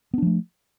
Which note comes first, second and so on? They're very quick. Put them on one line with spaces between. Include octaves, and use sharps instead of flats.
B3 D4 F3 A3